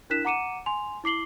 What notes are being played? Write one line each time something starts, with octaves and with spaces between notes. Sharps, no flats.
D4 E4 A#4 F#6 B6 E7
F#5 A#5 D6 C#7 D#7 E7
G#5 C6 F7
E4 D6 C7 F#7 G7